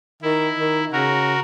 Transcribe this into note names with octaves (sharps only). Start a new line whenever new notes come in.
D#3 E4
D#3
C#3 F#4 A#4